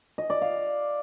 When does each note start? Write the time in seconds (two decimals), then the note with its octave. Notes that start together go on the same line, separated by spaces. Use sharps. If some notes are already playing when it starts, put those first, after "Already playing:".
0.18 D#5
0.30 D5
0.42 F5